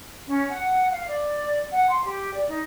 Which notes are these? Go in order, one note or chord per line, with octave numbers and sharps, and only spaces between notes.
C#4
F#5
F5
D5
F#5
C6
G4
D5
D#4